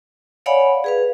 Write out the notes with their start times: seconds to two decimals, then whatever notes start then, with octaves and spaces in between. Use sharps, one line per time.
0.46 C#5 D5 F5 F#5 G#5 B5
0.84 G#4 B4 F5